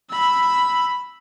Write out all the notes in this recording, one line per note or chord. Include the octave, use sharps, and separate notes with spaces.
B5 E6